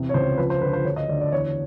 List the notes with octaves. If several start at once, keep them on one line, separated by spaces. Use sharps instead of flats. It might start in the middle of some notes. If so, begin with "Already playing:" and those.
Already playing: E2 C3
C#5
C#2 C5
F3 B4
C5
D3 B4
C5
D2 C#5
D#5
D2 D5
D5
E2 C#5